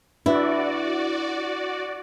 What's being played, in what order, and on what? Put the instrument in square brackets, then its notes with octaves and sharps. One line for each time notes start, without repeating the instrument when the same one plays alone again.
[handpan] D4 B4 E5 [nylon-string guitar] E4 [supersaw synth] F#4 D5